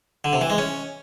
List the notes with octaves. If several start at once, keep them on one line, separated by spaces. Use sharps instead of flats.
D3
C3
E3
G#3
C#4